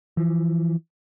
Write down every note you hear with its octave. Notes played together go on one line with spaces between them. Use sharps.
E3 F3